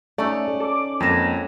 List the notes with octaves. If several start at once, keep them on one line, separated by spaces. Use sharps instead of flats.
A3 C#4 D#4 D5
A4 D6
F2 F#3 G#3 A#3 A#6 E7